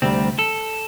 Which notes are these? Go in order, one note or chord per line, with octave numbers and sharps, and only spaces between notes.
D2 C3 G3 C4
A4